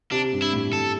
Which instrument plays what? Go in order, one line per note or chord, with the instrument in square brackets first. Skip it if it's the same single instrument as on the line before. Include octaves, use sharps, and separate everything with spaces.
[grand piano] C3 [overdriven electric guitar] D4
[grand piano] G2
[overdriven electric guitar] E4
[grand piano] A2
[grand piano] A2 [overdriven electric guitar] A4